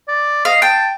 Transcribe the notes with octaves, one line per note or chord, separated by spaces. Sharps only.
D5
D#5 F5
G5 A5